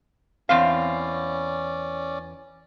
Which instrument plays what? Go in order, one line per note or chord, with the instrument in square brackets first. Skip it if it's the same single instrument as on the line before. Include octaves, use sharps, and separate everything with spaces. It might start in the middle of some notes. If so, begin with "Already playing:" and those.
[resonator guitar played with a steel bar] E2 C4 F5 [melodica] C#4 D5